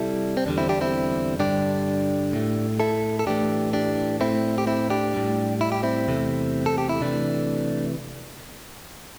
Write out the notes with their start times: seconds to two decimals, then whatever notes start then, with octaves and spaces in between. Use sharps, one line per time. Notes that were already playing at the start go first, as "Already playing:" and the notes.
Already playing: C3 G3 E4 A4
0.37 C4
0.46 E2 D3 G3 D4
0.58 C4 E4
0.69 D4 G4
0.81 C4 E4
1.39 G2 D3 G3 D4 G4
2.33 A2 A3
2.80 E4 A4
3.19 A4
3.27 A2 E3 A3 D4 G4
3.73 D4 G4
4.20 A2 A3 C4 E4
4.58 G4
4.67 C4 E4
4.90 D4 G4
5.14 A2 G3
5.61 E4
5.72 G4
5.83 C4 E4
6.07 E2 C3 A3
6.66 A4
6.78 G4
6.89 E4
7.01 C3 E3 A3 D4